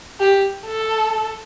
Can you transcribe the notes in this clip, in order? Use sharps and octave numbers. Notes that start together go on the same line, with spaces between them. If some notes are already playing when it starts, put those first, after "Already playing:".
G4
A4